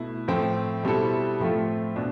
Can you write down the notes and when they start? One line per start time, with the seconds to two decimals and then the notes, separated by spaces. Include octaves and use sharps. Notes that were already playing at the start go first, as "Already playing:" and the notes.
Already playing: B2 A3 E4
0.28 A2 F3 C4
0.83 B2 G3 C4 E4 A4
1.40 A2 F3 A3 C4 F4
1.96 B2 D4